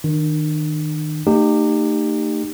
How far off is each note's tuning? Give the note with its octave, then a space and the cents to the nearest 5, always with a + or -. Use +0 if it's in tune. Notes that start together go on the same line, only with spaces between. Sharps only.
D#3 +0 D4 +45
A3 +45 D#4 -35 G4 +5